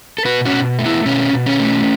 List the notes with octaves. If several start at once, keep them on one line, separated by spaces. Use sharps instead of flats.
A4
B2 F#4 B4
C#4 F#4
B2
A3
B3 E4
B2 C#4
B2
C#4
A3